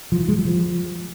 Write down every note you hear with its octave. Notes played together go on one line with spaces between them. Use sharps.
F3
E3
G#3
F#3
F3